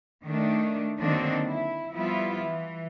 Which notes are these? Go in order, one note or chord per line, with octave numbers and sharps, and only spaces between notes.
D#3 A3 D4
D3 D#3 F#3 A#3 C4 D4
E4
F3 G3 B3 E4 F4
E3